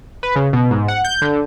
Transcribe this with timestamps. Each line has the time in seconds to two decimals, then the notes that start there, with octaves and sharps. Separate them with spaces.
0.23 B4
0.36 C#3
0.53 B2
0.71 G#2
0.88 F#5
1.05 G6
1.22 D3